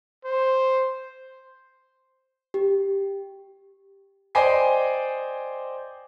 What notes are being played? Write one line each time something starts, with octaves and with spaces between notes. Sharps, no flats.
C5
G4
C5 D5 D#5 G5 G#5 C7